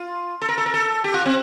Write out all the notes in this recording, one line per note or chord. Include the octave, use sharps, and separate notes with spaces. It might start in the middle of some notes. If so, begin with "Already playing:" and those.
Already playing: F4
A4
A#4
A4
A#4
A4
G4
F4
C4